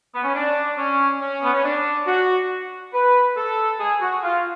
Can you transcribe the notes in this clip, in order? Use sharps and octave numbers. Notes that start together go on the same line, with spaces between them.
B3
C#4
D4
C#4
C#4
B3
C#4
D4
F#4
B4
A4
G#4
F#4
F4